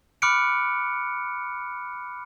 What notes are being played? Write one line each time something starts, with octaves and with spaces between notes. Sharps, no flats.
B5 D6 F6 F#6 C#7 D7